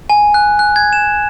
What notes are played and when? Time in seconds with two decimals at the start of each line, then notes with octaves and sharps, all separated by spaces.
0.10 G#5
0.34 F#6
0.59 F#6
0.76 G#6
0.93 E7